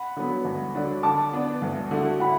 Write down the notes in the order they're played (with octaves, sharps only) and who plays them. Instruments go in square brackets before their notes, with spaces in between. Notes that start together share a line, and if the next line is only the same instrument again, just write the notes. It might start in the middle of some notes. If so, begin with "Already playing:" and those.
Already playing: [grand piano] F#5 B5
[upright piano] D3 F#3 B3
D2
D3 F#3 D4 F#4
[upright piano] D3 [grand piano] A5 D6
[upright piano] B3 D4
D2
D3 A3 F#4
[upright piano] A2 [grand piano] F#5 B5